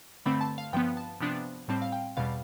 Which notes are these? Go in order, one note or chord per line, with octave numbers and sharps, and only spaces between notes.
G2 D3 A3 C4 B5
A5
F5
G2 F3 B3 G5
A5
C3 F3 B3 D4
A2 G3 C4 A5
F5
G5
E2 B2 G3 F5